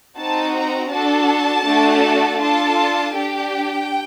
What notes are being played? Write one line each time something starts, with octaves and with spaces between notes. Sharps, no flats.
C4 D#4 F#4 A5
A#5
D4 F#4 A4 A5
A3 D4 F#4 A4
D4 F4 A4 A5
D4 G4 G5